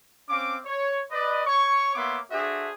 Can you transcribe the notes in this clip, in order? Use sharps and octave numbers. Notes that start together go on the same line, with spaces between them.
C4 C#4 F5 D6
C#5
B4 D5 D#5
C#5 C#6
A#3 B3 C#5 E5 C6 D6
D4 F#4 G#4 A4 C5 E5